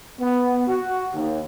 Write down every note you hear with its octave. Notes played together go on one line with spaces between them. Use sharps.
B3
F#4
D#2